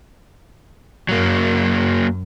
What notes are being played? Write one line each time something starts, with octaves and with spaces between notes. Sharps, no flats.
F#2 F#3 A#3